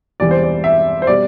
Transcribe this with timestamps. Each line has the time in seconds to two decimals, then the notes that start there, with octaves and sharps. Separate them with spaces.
0.20 E1 E2 C3 E3 G3 D5
0.31 C5
0.43 D5
0.64 E5
1.02 C5
1.07 B2 G3 D5